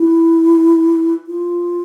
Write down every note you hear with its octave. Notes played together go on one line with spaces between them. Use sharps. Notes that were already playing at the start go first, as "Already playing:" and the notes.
Already playing: E4
F4